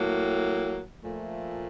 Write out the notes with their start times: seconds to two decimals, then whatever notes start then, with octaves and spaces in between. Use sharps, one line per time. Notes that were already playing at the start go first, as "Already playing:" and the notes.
Already playing: A2 F#3 A#3
1.04 A#2 F3 A3